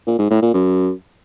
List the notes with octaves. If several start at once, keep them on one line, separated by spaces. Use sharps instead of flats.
A#2
G#2
A2
A#2
F#2